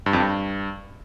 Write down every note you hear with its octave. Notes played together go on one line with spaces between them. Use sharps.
G2
F2
G2